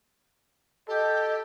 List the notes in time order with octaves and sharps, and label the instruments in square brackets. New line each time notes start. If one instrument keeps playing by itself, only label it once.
[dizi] G4 [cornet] A4 [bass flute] D#5